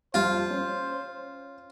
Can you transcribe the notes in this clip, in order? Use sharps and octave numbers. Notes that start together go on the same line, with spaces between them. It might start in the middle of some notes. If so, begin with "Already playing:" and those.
F2 G3 F4 C5
C#4